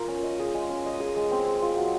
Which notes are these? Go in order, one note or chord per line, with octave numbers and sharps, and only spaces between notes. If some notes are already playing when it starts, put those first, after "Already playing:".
Already playing: F4 A#4 F5
C#4
D#5
G#4
G#3
C#4
D#5
G#4
G#3
C4
G#4
F4
F#3